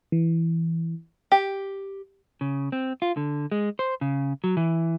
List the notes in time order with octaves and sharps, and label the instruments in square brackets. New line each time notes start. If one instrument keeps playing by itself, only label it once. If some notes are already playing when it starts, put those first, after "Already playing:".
[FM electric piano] E3
[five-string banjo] G4
[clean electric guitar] C#3
C4
F4
D3
G#3
C5
C#3
F#3
E3